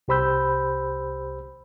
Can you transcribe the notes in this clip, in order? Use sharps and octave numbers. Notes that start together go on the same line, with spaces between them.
C2 G4 C5 B5 E6 G6